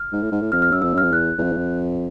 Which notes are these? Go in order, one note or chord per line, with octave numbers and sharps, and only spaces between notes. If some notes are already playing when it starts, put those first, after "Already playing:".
Already playing: F6
G#2
A2
G#2
A2
F2 F6
F6
F#2 E6
F2 E6
F#2 F6
F2
E2 F#6
E2
F2
E2
F2